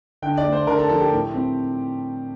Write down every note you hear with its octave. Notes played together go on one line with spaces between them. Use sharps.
D3 G5
D5
A3
C5
D3 A#4
A4
F3 A4
G4
A2
C4